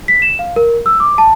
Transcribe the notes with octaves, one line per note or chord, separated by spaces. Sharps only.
B6
E7
F5
A#4
E6
D6
A5